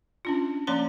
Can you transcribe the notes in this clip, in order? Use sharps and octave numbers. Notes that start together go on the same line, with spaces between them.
C#4 D4 F4
F3 A#3 C#4 D5 A#5 C6